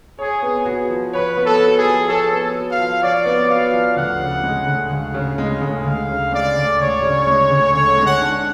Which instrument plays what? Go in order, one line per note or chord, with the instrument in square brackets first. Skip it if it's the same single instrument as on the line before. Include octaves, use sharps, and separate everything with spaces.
[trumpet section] G#4 [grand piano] C#5
[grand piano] B3
F#4
F3
[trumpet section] B4 [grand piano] C#5
[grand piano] B3
[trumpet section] A4
[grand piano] F#4
[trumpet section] G#4
[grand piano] F3
[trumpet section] A4 [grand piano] C#5
[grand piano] B3
F#4
[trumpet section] F5
[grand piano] F3
[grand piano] C#5 [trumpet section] D5
[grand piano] B3
[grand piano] F#4 [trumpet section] F5
[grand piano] F3
[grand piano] D2 [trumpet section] F#5
[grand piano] C#3
G#3
D2
[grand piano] D2 [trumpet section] F5
[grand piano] C#3
G#3
D2
[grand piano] D2 [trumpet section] F5
[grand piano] C#3
[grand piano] G#3 [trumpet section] D5
[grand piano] D2
[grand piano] D2 [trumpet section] C#5
[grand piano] C#3
G#3
D2
[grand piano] D3 [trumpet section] C#5
[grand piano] G#3
[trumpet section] F#5
[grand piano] D4